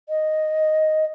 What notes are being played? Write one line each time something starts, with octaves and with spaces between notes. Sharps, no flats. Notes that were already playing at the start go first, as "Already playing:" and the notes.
D#5